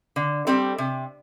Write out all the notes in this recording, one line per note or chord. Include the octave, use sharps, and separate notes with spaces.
D3
G3 C4 A4
C3